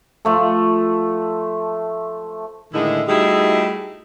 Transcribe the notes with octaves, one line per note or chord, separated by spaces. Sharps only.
F3 A3 A4
A2 D3 D#3 G#3 E4
G3 A3 D#4 E4 F#4 G#4